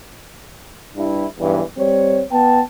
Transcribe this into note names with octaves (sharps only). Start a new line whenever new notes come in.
G2 E4
B1 E2 G2 E3
G3 C4 C#5
B3 G5 A5